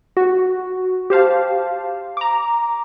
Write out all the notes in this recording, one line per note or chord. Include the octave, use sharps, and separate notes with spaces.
F#4
G4 C5 F5 A5
A#5 D6